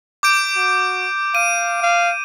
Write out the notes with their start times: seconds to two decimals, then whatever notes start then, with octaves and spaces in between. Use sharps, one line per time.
0.23 D6 G6 D7
0.56 F#4
1.35 F5 D#7
1.82 F5